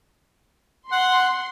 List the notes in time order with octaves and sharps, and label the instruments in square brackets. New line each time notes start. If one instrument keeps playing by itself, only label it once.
[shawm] F#5 [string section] C6